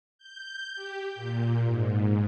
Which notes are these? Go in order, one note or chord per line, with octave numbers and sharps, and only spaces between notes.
G6
G4
A#2
G#2